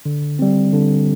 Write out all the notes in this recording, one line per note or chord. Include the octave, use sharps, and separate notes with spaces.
D3
G3 C4
D3